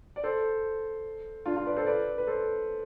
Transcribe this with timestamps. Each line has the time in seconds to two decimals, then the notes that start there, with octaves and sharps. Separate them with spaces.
0.16 D5
0.23 A4 C5
1.46 D4 F4
1.56 D4 F4
1.66 B4 D5
1.77 A4 C5
1.86 B4 D5
2.18 B4
2.27 A4 C5